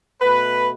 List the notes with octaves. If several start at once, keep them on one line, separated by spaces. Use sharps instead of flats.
B2 A3 B4